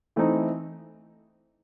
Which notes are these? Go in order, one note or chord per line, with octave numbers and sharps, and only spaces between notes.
E3 A3 C4 D#4